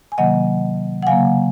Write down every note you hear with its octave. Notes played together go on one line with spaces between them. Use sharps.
G#5
C3 D#3 F#3 A#3 D#5 F#5
F#5
C#3 F#3 A#3 F5 G#5